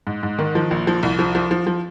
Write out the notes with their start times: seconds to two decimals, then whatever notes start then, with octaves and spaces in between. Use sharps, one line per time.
0.07 G#2
0.23 G#2
0.39 D#3
0.55 F3
0.71 A#1
0.87 F3
1.03 C2
1.19 F3
1.35 F3
1.51 F3
1.67 F3